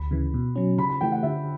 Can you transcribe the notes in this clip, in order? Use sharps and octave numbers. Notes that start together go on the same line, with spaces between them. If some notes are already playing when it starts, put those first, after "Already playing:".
Already playing: D2 B5
C#3 E3
B2
F#3 C#4
C#3 B5
B5
E3 A3 G5
F#5
D3 E5